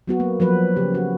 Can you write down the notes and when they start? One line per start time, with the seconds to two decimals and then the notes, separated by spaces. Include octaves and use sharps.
0.07 F#3 B3 F#4
0.20 A#3
0.40 F3 F#3 B4
0.76 C#3 G4
0.95 F#4